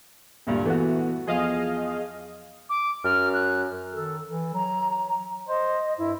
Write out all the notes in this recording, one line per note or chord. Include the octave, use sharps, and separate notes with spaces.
D2 G2 A#2
E3 A3 B3 F#4
E2 F3 G#4 D#5 F5
D6
F#2 F6
F#6
D#3 A4
E3 A4
F#3 A#5
C5 D#5
G2 E4